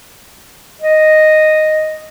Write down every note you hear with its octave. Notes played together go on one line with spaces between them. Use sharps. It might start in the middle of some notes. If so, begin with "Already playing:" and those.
D#5